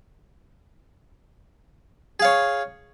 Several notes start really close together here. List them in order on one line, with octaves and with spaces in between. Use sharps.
G#4 F5 C#5